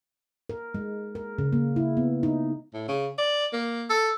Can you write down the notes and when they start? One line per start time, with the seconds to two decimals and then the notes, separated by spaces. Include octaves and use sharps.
0.49 A#4
0.74 G#3
1.15 A#4
1.38 C#3
1.53 A#3
1.76 E4
1.97 B3
2.23 D#4
2.74 A2
2.88 C#3
3.18 D5
3.53 A#3
3.90 A4